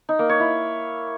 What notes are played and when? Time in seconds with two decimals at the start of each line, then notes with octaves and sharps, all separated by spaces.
0.09 D#4
0.19 A#3
0.29 C#5
0.40 E4